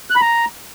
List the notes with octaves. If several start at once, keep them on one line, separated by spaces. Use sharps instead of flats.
F#6
B5
A#5